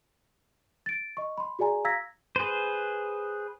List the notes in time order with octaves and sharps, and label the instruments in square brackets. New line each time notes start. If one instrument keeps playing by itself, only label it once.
[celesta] A6 D7
D#5 C#6
B5 C6
F#4 G#4 D5 G#5 A#5
F5 A#5 E6 G#6 A#6 B6
[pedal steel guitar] G#4 B4 C5